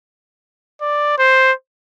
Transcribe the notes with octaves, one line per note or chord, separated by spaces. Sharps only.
D5
C5